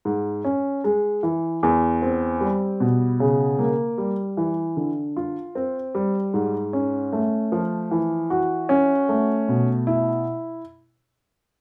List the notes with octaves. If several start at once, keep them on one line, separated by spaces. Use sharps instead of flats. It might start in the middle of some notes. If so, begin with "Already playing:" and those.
G#2
C#4
G#3
E3
E2
C4
G3
B2
C#3
A#3
G3
E3
D3
F4
C4
G3
G#2
C#4
A3
F3
E3
F#4
C#4
A3
B2
E4